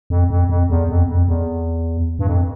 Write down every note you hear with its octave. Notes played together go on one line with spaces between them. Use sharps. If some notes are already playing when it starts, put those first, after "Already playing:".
F2
F2
F2
E2
F2
F2
E2
G2
F2